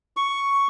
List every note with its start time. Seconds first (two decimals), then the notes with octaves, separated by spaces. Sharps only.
0.17 C#6